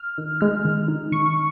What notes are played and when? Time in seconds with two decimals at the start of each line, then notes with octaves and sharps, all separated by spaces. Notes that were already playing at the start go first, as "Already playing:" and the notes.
Already playing: F6
0.18 D#3
0.41 G#3 F6
0.65 D#3
0.88 D#4
1.12 D#3 C#6